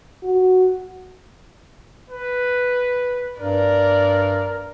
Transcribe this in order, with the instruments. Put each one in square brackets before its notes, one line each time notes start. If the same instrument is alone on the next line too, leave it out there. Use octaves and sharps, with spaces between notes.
[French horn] F#4
[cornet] B4
[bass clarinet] G2 [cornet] A#4 [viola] D5